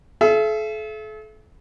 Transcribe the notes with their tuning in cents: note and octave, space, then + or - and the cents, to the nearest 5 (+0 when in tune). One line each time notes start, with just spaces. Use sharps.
A4 -40 E5 +35